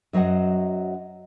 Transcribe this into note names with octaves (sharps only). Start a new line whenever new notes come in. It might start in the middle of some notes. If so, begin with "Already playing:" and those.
F#2 F#3 C5 D#5 F#5